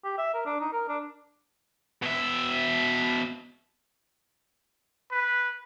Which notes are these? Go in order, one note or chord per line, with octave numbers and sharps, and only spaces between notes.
G4
E5
A#4
D4
D#4
A#4
D4
B2 E5
B4